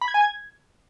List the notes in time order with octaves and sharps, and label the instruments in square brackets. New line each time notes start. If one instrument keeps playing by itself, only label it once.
[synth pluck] B5
G#6
G#5
G#6